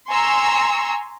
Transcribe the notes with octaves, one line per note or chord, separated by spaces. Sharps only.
G#5 A#5 C6 C#6 E6